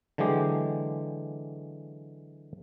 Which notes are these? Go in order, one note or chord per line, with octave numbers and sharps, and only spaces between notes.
D3 E3 F#3 G#3 G4